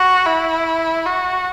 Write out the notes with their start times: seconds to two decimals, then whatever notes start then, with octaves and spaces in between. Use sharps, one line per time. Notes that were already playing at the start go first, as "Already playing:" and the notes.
Already playing: F#4
0.26 E4
1.05 F#4